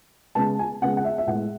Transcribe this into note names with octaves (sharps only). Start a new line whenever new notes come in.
C#3 G#3 B3 A5
G#5
C#3 G#3 B3 F#5
F#5
E5
E5
A2 G#3 B3 F#5